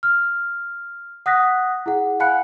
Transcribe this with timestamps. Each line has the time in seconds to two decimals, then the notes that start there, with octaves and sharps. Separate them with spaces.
0.03 F6
1.26 F#5 D#6 F#6 A#6 B6
1.86 E4 G#4 F#5
2.20 F5 F#5 G#5 B5 F#6 C#7